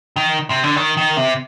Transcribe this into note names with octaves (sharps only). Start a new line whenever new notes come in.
D#3
C3
D3
D#3
D#3
C3